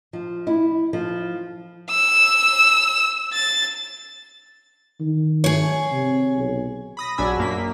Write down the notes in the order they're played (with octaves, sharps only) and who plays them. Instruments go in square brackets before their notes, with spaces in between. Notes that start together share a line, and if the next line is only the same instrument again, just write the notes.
[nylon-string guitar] F3
E4
F3
[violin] E6
A6
[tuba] D#3
[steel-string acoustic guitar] G#4 C#5
[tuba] C3
B1
[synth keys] B5 D#6 A#6
A#1 F#3 D4 G#5 B5 E6
F#2 A#3 B6